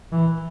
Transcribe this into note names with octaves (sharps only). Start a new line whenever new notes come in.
E3